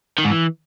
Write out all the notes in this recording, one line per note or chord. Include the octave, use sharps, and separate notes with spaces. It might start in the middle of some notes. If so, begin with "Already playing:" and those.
D#3
G#2
E3